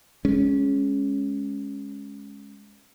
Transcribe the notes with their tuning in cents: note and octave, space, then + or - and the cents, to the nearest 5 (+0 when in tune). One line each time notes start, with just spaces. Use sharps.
G#3 +0 C#4 +0